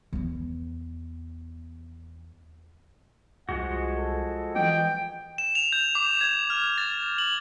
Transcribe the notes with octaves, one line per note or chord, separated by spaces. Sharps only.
E2 B3
C2 F3 G#3 F#4 F#5
A4
E3 D#5 G5
E7
F7
G6
D6
G#6
F6
A6
F#7